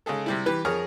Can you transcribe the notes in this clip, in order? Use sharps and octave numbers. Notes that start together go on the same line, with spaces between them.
C#3 G#3 G#4 A4
C3 G3 E4
E3 G4 B4
F2 G#4 A#4 C#5 F6